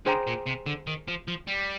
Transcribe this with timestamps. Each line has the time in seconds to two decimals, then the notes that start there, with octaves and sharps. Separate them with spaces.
0.06 D3 G#4 C5 G5 A#5
0.27 A#2
0.46 C3
0.66 D3
0.87 D#3
1.08 F3
1.28 F3
1.48 G3